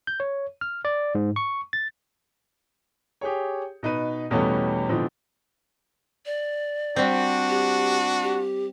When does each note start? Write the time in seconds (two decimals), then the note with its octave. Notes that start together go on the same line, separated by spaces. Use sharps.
0.07 G6
0.20 C#5
0.61 F6
0.85 D5
1.15 G#2
1.36 C#6
1.73 A6
3.21 G4 G#4 C#5
3.83 B2 D#4 B4 D#7
4.30 E2 B2 G3 A3 B3 C#4
4.89 B2 D3 E3 F3 C4
6.26 D5
6.96 G3 C4 D4 F#4
7.49 G4
8.22 G4